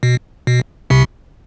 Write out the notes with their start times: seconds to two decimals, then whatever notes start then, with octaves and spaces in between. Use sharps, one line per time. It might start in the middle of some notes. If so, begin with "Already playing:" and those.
0.03 B2
0.47 B2
0.90 C2 C3